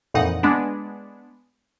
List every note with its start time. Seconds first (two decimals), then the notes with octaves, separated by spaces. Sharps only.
0.14 F2 A#2 E3 D#4 F#5
0.43 G#3 B3 D4